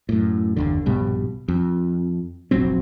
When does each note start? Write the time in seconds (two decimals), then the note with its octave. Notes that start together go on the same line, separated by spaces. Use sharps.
0.09 F#2 A2
0.57 F#1 D#2 D3
0.86 A#1 G2 B2 G3
1.48 F2
2.51 F1 A#1 F#3 C4